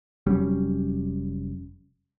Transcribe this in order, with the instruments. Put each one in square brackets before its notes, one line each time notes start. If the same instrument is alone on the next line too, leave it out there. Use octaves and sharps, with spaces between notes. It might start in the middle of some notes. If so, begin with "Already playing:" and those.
[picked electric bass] F1 F#3 G3 C#4